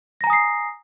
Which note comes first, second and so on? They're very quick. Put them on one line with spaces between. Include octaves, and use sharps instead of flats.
A#6 A#5 G#5 D#6 C7